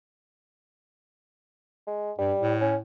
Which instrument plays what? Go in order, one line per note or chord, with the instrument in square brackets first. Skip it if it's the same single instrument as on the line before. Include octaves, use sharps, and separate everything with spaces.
[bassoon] G#3
[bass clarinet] G2 [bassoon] G3
[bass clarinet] A2
[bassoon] C#4